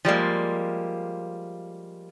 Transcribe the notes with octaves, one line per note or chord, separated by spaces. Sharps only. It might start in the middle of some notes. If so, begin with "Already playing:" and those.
F3 G3 G#3 A#3